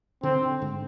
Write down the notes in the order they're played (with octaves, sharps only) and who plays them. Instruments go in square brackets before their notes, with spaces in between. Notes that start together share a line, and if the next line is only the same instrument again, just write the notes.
[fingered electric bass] D3 [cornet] C4
[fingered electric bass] D3
G#2